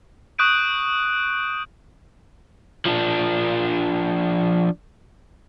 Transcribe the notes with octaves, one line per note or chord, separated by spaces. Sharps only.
C#6 D#6 F#6 G6 D7 D#7
F3 D4